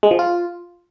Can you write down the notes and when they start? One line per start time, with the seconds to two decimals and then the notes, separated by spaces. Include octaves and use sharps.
0.03 G#3
0.11 F3
0.19 F4